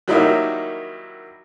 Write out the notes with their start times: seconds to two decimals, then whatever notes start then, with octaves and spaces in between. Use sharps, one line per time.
0.08 D#3 F#3 G3 A#3 D#4 E4